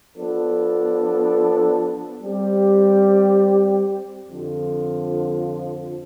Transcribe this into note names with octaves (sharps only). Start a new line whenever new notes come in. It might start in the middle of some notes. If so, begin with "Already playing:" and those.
F3 B3 D4 A4
G3 C4 G4
F2 D3 F3